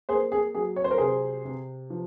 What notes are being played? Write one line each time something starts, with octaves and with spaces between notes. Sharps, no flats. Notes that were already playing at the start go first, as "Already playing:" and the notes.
A#3 G#4 C5
G#4
F#3 G#4
C#5
C5
A#4
C3 G#4 C5
C3
F3